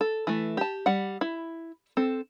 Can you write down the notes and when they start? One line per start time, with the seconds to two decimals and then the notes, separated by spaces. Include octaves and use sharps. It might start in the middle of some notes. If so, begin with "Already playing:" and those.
0.01 A4
0.27 E3 A3
0.57 G4 A5
0.86 G3 F#5
1.21 E4
1.97 C4 A4